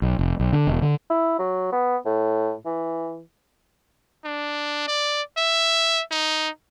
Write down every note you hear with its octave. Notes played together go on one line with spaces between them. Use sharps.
B1
F1
B1
D3
E1
D3
E4
F#3
B3
A2
E3
D4
D5
E5
D#4